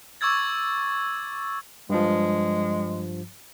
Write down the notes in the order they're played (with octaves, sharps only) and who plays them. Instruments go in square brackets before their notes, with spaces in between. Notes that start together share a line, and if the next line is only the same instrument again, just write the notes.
[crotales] C#6 D6 E6 G#6 A6
[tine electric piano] G2 F3 [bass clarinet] G#3